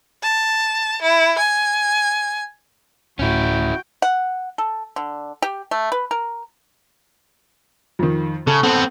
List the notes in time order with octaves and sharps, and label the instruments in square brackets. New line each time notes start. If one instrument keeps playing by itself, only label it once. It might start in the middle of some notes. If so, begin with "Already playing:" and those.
[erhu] A5
E4
G#5
[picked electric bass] D1 A2 [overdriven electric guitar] C#4 E4 [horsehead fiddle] F#4 G5
[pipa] F#5
A4
D3
G4
A3
B4
A#4
[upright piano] F2 D#3
[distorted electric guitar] C#3 [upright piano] A4
[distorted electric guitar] B3 C4 [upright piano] A4